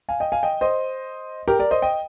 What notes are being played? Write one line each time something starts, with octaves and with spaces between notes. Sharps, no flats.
F5 G#5
D#5 G5
F5 G#5
D#5 G5
C5 D#5
G4 A#4
A#4 D5
C5 D#5
D#5 G5